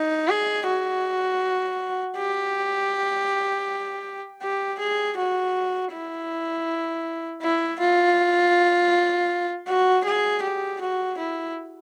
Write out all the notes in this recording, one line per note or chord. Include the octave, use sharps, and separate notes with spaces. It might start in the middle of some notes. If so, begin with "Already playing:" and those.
Already playing: D#4
G#4
F#4
G4
G4
G#4
F#4
E4
E4
F4
F#4
G#4
G4
F#4
E4